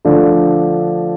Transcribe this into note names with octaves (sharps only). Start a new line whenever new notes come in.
D3 F3 A3 D4